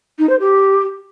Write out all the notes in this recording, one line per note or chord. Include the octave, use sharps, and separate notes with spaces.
D#4
C5
G4